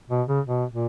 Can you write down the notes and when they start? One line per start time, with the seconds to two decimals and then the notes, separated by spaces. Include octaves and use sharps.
0.10 B2
0.28 C#3
0.46 B2
0.73 A#2